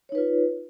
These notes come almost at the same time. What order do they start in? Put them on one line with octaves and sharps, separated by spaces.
C#5 D#4 B4 F4